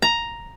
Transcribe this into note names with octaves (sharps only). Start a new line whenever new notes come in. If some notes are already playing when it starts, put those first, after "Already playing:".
A#5